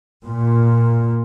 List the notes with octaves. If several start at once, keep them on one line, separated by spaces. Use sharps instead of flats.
A#2